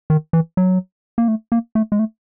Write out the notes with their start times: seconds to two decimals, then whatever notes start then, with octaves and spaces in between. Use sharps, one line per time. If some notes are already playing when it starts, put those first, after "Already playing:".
0.10 D#3
0.33 E3
0.57 F#3
1.18 A#3
1.28 A3
1.52 A#3
1.75 A3
1.92 G#3
1.99 A3